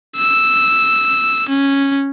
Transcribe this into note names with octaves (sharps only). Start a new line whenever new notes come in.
E6
C#4